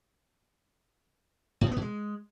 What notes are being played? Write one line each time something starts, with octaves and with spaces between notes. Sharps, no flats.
A2
B2
B3
B2
G#3